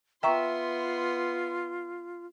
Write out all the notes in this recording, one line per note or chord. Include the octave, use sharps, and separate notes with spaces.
B3 F4 E5 G5 A#5 C6 C#6